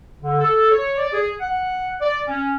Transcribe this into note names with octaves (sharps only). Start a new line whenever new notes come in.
D3
A4
C#5
D5
G#4
F#5
D5
C#4